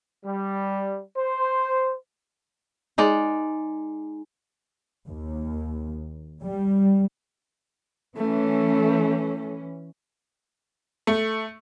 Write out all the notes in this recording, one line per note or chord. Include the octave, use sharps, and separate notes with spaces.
G3
C5
G#3 D#4 D5
D#2
G3
E3 A3 C#4
A3